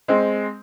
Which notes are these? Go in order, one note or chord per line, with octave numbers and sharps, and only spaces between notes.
G#3 C4